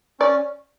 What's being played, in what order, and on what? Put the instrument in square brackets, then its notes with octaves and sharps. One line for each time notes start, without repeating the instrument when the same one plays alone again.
[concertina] C#4 [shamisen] D5